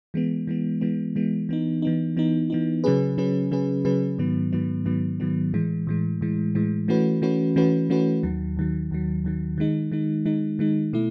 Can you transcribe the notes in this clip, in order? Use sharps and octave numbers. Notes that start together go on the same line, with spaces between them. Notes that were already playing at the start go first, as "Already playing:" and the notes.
E3 G#3 B3
E3 G#3 B3
E3 G#3 B3
E3 G#3 B3
E3 B3 D#4
E3 B3 D#4
E3 B3 D#4
E3 B3 D#4
C#3 F#3 C#4 G#4 B4
C#3 F#3 C#4 G#4 B4
C#3 F#3 C#4 G#4 B4
C#3 F#3 C#4 G#4 B4
G#2 D#3 F#3 B3
G#2 D#3 F#3 B3
G#2 D#3 F#3 B3
G#2 D#3 F#3 B3
A2 E3 G#3
A2 E3 G#3
A2 E3 G#3
A2 E3 G#3
E3 A3 C#4 F#4 B4
E3 A3 C#4 F#4 B4
E3 A3 C#4 F#4 B4
E3 A3 C#4 F#4 B4
D#2 D#3 F#3
D#2 D#3 F#3
D#2 D#3 F#3
D#2 D#3 F#3
D#3 G#3 D#4
D#3 G#3 D#4
D#3 G#3 D#4
D#3 G#3 D#4
B2 A3 E4